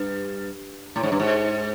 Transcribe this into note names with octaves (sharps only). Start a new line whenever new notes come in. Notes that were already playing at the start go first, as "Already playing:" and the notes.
Already playing: G2
A2
G#2
G2
G#2